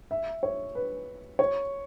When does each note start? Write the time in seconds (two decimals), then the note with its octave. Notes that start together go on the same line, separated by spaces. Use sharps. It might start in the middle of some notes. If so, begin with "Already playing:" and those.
0.11 E5
0.43 C#5
0.75 B4
1.39 C#5